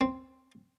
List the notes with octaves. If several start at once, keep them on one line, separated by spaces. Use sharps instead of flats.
C4